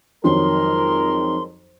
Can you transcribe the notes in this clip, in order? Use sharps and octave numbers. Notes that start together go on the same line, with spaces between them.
F2 D#3 F#3 G#3 A#4 C6